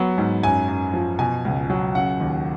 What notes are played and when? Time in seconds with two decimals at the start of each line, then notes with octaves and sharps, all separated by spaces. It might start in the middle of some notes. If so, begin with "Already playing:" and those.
Already playing: F#3 B3
0.18 G#2
0.43 F#2 G#5
0.68 F#2
0.94 F3
1.19 B2 G#5
1.45 C#2
1.70 F#3
1.95 C#3 F#5
2.20 D#2